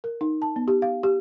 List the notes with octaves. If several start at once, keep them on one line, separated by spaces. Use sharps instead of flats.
A#4
D#4
A5
B3
G4
F5
G4